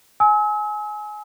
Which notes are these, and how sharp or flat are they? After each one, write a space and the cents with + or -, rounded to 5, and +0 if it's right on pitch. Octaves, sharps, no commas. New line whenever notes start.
G#5 +20 E6 -40